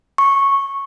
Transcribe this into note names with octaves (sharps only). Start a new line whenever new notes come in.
C#6